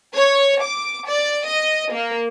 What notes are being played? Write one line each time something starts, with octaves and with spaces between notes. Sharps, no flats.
C#5
D6
D5
D#5
A#3